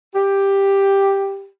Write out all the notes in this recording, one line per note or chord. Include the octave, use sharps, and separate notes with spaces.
G4